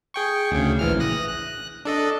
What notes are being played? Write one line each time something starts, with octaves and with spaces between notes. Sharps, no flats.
G#4 G5 C#6
D2 C#3
A#1 E3 F6
D#6 F#6 A#6
F#6
D4 A4 D#5